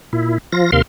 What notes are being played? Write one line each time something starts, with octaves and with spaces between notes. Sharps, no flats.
A#2 E4
F3 F4 A#6
D#2 C3 A#4 F5 C6